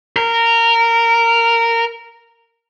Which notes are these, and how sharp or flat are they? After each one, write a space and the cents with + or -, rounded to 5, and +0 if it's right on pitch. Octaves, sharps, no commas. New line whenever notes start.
A#4 -15